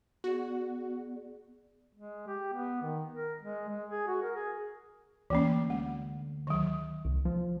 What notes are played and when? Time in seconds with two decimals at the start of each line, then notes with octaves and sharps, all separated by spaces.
0.24 B3 F#4 G#4 D5
1.95 G#3
2.27 G4
2.53 B3
2.82 D#3
3.14 A#4
3.41 G#3
3.69 G#3
3.90 G#4
4.07 F#4
4.23 A#4
4.36 G#4
5.30 D2 E3 A#3 C#4
5.70 G#3
6.47 D#3 F#3
7.05 C2
7.25 F3